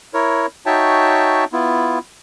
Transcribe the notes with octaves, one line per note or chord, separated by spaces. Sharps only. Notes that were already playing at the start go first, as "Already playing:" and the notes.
E4 A#4 C#5
D#4 F#4 C#5 E5 G5 A5
B3 E4 F4